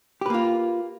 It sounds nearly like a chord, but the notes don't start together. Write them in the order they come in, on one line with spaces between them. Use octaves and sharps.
G4 B4 A#3 F4